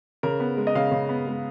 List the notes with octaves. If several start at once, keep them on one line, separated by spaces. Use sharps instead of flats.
C#3 A#4
B3
G#3
D#5
C#3 F5
C#3
B3
G#3